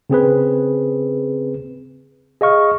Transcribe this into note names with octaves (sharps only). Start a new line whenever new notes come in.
C#3 C4 G#4 B4
G#4 D#5 F5 C#6 F6